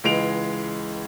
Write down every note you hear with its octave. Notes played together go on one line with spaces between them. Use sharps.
C#2 E3 G#3 D7 F7